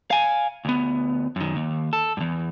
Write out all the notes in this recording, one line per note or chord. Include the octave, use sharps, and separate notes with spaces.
F5 G#5
D2 B3
F#2 D#3
D#2
A4
E2 G2